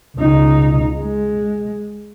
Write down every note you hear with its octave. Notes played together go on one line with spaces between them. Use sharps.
C#2 D#4
G#3